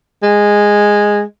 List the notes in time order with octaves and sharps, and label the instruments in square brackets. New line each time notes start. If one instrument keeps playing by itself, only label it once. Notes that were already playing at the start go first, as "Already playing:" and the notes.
[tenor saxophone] G#3